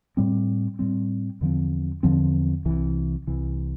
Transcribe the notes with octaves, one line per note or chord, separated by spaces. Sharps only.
A2 G3 C4
A2 G3 C4
E2 D3 F3 C4
E2 D3 F3 C4
C2 C3 E3
C2 C3 E3